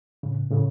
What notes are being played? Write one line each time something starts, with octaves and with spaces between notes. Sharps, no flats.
A2 C#3
A2 C#3